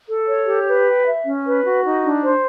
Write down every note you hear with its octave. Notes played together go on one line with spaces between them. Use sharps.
A4
C#5
G4
B4
G5
E5
C#4
B4
F#4
D#4
D4
C5